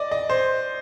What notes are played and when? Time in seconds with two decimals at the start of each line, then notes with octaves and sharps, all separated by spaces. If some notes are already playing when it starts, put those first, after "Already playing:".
Already playing: D5 D#5
0.11 D#5
0.29 C5